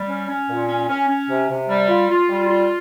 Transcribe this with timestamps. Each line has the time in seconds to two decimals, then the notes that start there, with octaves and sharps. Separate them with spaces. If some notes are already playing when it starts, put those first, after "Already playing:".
Already playing: G3
0.08 C#4
0.28 C#4
0.49 A#2
0.68 C#4
0.89 C#4
1.08 C#4
1.29 C3
1.49 C3
1.69 G3
1.89 F4
2.09 F4
2.29 G3
2.48 F4